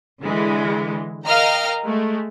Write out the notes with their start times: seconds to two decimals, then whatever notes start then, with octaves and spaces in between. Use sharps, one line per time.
0.23 D3 E3 G#3
1.27 A#4 D#5 F5 G5 A#5 F6
1.84 G#3 A3